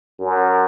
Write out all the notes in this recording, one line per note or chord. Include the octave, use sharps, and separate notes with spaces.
F#2